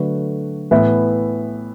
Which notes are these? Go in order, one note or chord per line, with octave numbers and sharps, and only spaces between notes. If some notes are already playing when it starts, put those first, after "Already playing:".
Already playing: D3 F#3 A3 F#4 B4
A2 E3 B3 B4 E5